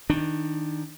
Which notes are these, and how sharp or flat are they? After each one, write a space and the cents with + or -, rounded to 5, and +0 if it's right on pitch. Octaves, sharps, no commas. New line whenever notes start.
D#3 +15 D4 +15